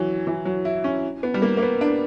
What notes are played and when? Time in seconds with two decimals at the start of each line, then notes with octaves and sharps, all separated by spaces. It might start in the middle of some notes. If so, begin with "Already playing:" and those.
Already playing: E3 F#3
0.27 E3
0.45 F#3
0.65 E4
0.84 C#4
1.23 B3
1.34 G3
1.42 A#3
1.57 A#3
1.62 B3
1.81 D4